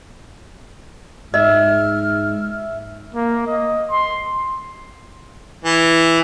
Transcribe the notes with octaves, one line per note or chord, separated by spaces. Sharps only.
G#2 D#5 E5 F6
A#3
D#5
C6
E3